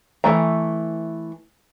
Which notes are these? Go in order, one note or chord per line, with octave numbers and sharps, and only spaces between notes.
E3 A3 A#5